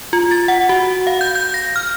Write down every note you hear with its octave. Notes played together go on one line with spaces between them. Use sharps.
F4
A6
F#5
F#4
F5
G6
G6
A#6
F6